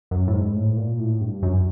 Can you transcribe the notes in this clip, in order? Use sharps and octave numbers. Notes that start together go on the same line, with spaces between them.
F#2
A2
G#2
A2
A#2
A2
G2
F#2